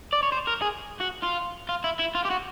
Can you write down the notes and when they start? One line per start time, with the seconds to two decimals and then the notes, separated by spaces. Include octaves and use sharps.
0.13 D5
0.23 C#5
0.32 C5
0.47 A#4
0.62 G#4
1.00 F#4
1.22 F4
1.69 F4
1.84 E4
1.99 E4
2.15 F4
2.25 G4
2.30 F#4